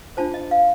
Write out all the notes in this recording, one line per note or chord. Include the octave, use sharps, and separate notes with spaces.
D4 F4 C5 A5
D#5
F5